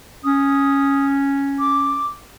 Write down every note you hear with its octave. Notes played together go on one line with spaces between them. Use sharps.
C#4 D#6
D6